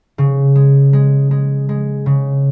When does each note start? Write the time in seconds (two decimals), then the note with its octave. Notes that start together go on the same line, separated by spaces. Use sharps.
0.18 C#3
0.55 G#3
0.93 G#3
1.31 G#3
1.69 G#3
2.06 C#3